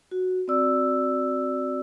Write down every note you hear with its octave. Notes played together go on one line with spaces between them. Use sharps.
F#4
C4 F#4 D5 E6